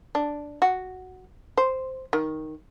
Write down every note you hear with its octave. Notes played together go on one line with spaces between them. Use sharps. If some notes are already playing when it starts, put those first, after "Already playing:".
D4
F#4
C5
D#3